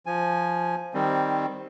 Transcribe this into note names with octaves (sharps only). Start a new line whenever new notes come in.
F3 G#5
D#3 G3 C4